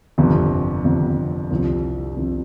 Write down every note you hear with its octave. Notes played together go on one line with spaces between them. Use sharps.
G1 F2 C3
G1 F2 C3
C2 C3 F3
C2 C3 F3